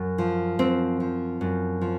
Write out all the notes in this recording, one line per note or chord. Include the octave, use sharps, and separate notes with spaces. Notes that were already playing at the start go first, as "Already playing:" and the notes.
Already playing: F#2
F3
F#2 C4
F3
F#2
F3